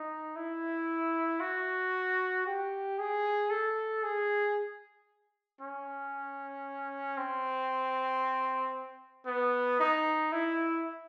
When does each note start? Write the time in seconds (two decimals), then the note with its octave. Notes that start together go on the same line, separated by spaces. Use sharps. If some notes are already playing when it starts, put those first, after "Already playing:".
Already playing: D#4
0.36 E4
1.40 F#4
2.46 G4
2.99 G#4
3.50 A4
4.03 G#4
5.61 C#4
7.17 C4
9.26 B3
9.80 D#4
10.32 E4